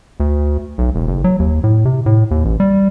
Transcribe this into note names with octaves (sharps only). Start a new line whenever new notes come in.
D2
B1
E1
F#1
F#3
D#2
A2
C3
A2
D#2
A1
G3